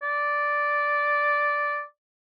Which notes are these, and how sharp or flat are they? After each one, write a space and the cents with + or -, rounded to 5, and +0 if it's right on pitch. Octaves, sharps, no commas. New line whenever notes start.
D5 -5